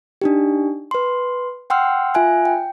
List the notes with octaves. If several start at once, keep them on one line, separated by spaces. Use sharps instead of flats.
D4 D#4 G4
B4 C6
F#5 G5 C6 E6 F6
F4 E5 G#5 F#6
G5